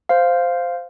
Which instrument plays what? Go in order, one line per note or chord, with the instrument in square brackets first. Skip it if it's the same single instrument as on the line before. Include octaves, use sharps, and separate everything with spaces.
[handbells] C5 F5